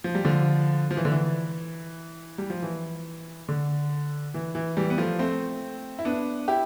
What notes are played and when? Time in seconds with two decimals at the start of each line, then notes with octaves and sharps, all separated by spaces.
0.04 F3
0.15 G3
0.25 D3 F3
0.91 F3
0.97 E3
1.05 D3
1.12 E3
2.38 G3
2.50 F3
2.62 E3
3.48 D3
4.34 E3
4.55 E3
4.77 E3 G3
4.90 B3
4.98 F3 A3
5.19 A3 C4
5.99 E4
6.05 B3 D4
6.48 E4 G4